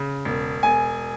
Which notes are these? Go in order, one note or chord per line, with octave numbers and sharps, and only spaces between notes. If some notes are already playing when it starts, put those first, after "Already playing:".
Already playing: C#3
E1
E1 G#5